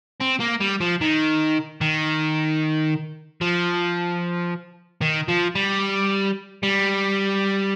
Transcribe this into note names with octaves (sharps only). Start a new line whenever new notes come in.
C4
A#3
G3
F3
D#3
D#3
F3
D#3
F3
G3
G3